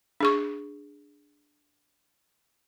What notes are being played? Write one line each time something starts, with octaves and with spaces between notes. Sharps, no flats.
D4 G#4 C#6